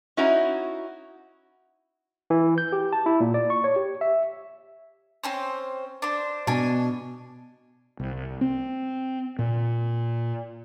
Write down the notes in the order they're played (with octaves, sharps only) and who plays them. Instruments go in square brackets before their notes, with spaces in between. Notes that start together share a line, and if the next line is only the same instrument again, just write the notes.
[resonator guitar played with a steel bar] C#4 D#4 E4 F#4 A#5
[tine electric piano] E3
G6
G4
A5
E4
A#2
D5
C#6
C#5
G4
E5
[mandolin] C4 C#4 C5
D4 C5
[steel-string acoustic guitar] B2 [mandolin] D4 G#5
[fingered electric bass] C2
C4
A#2